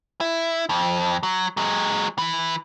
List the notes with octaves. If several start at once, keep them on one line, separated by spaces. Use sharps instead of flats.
E4
F2
F#3
F#3 G#3
E3